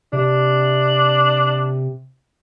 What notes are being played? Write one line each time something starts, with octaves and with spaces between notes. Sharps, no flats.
C3 D4